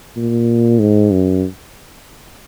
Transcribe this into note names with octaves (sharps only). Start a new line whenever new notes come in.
A#2
G#2
F#2